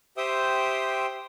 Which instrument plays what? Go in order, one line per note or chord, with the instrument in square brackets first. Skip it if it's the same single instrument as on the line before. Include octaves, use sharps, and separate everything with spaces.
[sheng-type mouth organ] G4 C5 E5 G5 C6 D#6